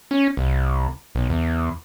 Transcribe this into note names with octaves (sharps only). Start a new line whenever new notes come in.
C#4
C2
B1
E2